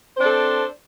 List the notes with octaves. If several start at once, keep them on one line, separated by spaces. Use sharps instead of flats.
C4 D4 A4 C5